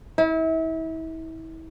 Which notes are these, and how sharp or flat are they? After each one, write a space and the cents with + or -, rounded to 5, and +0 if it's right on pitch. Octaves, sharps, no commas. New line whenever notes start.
E4 -35